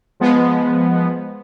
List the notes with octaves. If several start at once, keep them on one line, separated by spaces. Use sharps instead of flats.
F3 G#3 B3